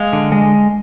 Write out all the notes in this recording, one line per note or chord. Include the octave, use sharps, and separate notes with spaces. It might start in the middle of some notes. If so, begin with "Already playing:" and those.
Already playing: G#3 F5
D3
G#3